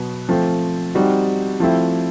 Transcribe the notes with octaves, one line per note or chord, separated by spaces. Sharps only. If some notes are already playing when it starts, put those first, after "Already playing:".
Already playing: B2 F#3 B3
F3 A3 C4
G3 C4 D#4 F#4
F3 A3 C4 E4